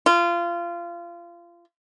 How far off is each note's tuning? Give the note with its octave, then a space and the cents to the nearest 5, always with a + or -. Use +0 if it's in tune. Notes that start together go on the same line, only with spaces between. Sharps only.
F4 -25